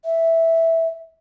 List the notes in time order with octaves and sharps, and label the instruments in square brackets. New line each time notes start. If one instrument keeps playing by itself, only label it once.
[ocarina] E5